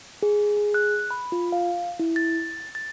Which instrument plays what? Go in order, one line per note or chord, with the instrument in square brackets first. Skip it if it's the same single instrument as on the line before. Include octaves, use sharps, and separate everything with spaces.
[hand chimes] G#4
G#4
F#6
B5
F4
F5
E4
A6
A6